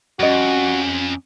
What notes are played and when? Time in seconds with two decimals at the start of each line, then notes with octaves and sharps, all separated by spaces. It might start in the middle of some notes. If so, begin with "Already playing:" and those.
0.20 F2 G3 C#4 F#4 D#5